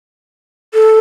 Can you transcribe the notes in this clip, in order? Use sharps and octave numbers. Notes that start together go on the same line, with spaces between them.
A4